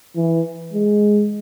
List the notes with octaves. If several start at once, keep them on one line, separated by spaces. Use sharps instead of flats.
E3
G#3